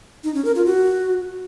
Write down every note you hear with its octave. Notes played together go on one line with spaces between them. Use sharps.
D#4
C#4
A#4
F4
F#4